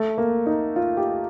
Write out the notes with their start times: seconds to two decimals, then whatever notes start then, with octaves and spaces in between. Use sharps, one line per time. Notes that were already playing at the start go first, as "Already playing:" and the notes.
Already playing: A3
0.18 A#3
0.46 D#4
0.76 F4
0.97 G4